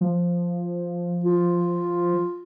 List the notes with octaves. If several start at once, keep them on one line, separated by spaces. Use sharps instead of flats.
F3
F4